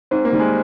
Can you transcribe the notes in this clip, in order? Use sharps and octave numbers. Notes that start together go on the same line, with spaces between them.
G#2 C4
A#3
D#3 G3
G#3